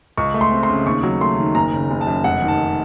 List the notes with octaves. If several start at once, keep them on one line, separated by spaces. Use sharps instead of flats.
C#2 C#6
A3
C6
C4
C6
C#3
D#2 C#6
F#3
A3 C6
D#3
F#1 A#5
C#3
F#1
A5
F#2
F1 F#5
D#3
A5